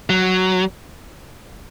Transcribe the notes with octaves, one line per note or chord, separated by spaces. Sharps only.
F#3